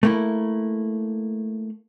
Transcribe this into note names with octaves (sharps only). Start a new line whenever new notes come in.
A3 A#3 E4